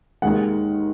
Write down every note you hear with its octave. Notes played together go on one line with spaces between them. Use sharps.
D#2 D#3 G#3 F#5